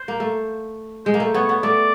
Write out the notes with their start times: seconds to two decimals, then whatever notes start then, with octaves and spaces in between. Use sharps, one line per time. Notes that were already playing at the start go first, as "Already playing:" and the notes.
Already playing: C5
0.08 A#3
0.20 A3
1.06 G#3 C5
1.14 A#3
1.20 A3
1.34 B3 C#5
1.49 B3
1.63 A3 D5